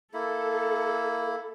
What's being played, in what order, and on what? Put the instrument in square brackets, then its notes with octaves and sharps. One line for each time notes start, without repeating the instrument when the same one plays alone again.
[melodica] A#3 E4 [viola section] A4